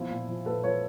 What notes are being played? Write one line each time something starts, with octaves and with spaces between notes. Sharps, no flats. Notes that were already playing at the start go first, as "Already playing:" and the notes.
Already playing: B2 F3 E4
A#2
F3
A#2 A4 B4
F3 B4 C#5